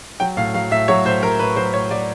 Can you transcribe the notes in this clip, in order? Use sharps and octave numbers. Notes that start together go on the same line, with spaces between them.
F#3 G5
A2 F5
F#3 F5
A2 E5
F#3 C#5
A2 C5
F#3 A#4
A2 B4
F#3 C5
A2 C#5
F#3 D5